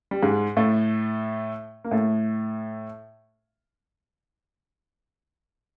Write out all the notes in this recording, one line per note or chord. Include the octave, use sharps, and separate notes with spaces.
G3
G#2 G#3
A2 A3
A#3
A2 A3